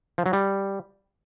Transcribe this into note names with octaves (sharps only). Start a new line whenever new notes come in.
F3
F#3
G3